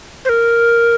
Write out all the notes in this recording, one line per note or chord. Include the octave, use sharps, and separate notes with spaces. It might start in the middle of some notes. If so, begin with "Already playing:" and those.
C5
A#4